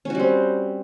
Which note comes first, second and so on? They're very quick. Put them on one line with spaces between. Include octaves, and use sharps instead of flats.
C#4 F#4 G3 C4